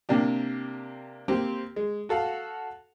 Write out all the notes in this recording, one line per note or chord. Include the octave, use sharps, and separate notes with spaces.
C3 A#3 D4 G4
A#3 C4 G4
G#3
F#4 A4 F5 F#5